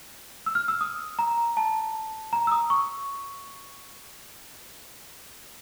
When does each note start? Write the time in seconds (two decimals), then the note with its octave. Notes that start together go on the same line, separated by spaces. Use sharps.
0.46 E6
0.55 F6
0.68 E6
0.81 D#6
1.19 A#5
1.57 A5
2.33 A#5
2.47 E6
2.52 D#6
2.70 C#6